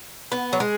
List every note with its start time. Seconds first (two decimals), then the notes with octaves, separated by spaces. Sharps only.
0.32 B3
0.53 F#3
0.60 G#3